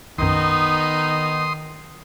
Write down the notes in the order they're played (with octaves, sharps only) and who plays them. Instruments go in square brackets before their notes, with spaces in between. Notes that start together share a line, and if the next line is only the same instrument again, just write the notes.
[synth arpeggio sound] B1 F#2 [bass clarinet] D#3 [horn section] B3 D#4 [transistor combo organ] C6 D#6